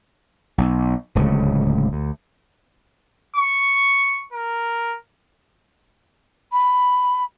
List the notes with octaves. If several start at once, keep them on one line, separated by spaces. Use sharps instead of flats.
B1
D1 C#2 A2 C#3
D2
C#6
A#4
B5